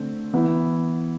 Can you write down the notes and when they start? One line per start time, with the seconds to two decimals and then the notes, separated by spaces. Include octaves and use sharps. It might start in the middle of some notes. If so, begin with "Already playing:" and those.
Already playing: D3 A3 C4
0.33 E3 B3 E4